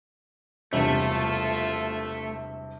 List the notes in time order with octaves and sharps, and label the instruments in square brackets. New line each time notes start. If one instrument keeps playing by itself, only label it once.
[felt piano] E1 G2 C3 [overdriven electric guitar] A3 [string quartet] F4 A4 E5